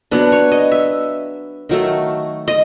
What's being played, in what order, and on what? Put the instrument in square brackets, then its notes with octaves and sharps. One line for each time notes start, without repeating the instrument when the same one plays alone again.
[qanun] F#3 B3 D4 B4
C#5
D#5
E5
D#3 F#3 A3
D#5